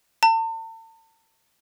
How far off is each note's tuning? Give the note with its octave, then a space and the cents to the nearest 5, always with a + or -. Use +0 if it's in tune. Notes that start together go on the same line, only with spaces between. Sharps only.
A5 +40